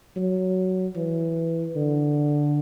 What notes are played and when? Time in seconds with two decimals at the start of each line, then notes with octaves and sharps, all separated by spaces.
0.16 F#3
0.96 E3
1.76 D3